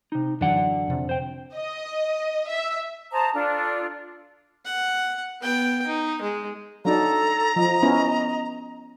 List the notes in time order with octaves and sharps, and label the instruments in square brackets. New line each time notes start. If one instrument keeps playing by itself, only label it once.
[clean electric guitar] C3 D#4
[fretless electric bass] F#2 E3 F#3 [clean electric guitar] D3 D5 F#5
[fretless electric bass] F2 C3
[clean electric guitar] C5 G5
[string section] D#5
E5
[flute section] C5 A5 A#5 D#6
D4 F4 A4
[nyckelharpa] F#5
B3 G5
D#4
G#3
[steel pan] F#3 D4 D#4 [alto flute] A4 [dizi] A#5
[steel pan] F3 [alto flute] D#5
[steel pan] B3 C#4 E4